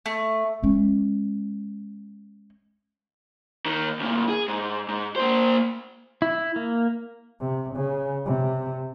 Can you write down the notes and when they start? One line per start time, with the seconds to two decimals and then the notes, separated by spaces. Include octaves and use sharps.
0.06 A3
0.63 G#3 C#4
3.66 D#2 D#3
3.99 D2 A#2
4.29 G#4
4.48 G#2
4.88 G#2
5.16 A#3 C5
6.22 E4
6.56 A#3
7.41 C3
7.75 C#3
8.25 C3